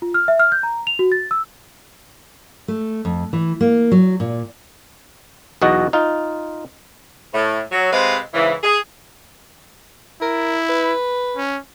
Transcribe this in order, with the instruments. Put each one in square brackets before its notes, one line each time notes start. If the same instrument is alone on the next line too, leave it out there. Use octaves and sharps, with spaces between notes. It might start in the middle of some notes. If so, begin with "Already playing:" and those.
[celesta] F4
F6
E5
F6
G6
A#5
F7
F#4
A6
E6
[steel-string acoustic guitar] A3
F2
E3
A#3
F#3
A#2
[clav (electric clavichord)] B1 E2 B2 F#4 D#5
D#4 F4
[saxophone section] A2
F#3
C3 G#3 C4 B4 F5
G#2 C#3 E3
G#4
[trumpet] E4 [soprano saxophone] A#4
[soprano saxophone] B4
[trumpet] C#4